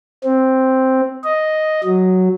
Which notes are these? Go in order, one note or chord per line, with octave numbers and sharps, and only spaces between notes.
C4
D#5
F#3